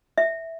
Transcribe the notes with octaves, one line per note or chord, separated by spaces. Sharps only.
E5